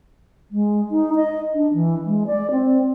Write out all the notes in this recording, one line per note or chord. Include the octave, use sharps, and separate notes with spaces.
G#3
D#4
D#5
D4
E3
G#3
D5
C4